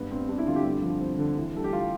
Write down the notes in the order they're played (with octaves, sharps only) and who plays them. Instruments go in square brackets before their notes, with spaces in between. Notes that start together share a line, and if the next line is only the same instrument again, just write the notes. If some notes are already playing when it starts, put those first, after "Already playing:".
Already playing: [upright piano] G2 [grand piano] B3
[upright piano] G2 [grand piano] C4
[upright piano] G2 [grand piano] D4
[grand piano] E4
[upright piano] D3 [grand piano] F4
[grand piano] G4
[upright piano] G2 [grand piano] F4
[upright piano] F3
C4
D3
E3
[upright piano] G3 [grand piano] A4
[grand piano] G4
[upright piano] G3 [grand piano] F4